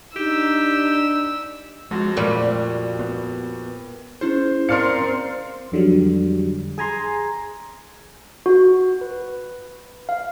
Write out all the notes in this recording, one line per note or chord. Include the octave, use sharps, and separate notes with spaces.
D4 D#4 G4 E6
F2 G#3 F#4 A#6
A#2 G3 A3
B3
C#4 E4 G#4 C5
C4 A#4 D5 F5 C6 F6 C#7
F2 D3 F#3 G3
G#4 G#5 A#5 C6
F#4
B4
F5